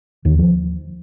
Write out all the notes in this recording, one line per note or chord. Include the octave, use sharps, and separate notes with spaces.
D#2 D#3
F3